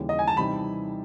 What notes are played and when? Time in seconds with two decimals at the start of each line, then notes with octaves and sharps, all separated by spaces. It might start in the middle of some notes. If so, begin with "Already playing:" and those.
Already playing: D#2 C#3 E3 G3
0.09 D#5
0.19 G#5
0.27 A5
0.37 C3 E3 G3 C4 D#4 B5